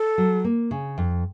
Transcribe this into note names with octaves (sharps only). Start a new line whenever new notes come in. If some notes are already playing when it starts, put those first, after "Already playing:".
Already playing: A4
F#3
A#3
C#3
F2